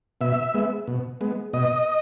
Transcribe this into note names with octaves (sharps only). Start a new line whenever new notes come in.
B2 E5
G#3 B3
B2
G#3 B3
B2 D#5